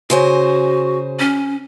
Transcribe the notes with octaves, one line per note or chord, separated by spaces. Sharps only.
C#3 F#4 C5 G#5
C#4